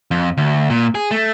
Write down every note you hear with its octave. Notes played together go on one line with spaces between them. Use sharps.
F2
D2
A#2
G#4
A3